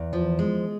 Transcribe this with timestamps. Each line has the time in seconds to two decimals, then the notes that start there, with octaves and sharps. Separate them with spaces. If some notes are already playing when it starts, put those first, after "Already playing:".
Already playing: E2
0.13 F3
0.39 G#3